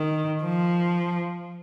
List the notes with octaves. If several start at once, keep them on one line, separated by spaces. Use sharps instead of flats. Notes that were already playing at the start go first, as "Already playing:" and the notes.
Already playing: D#3
F3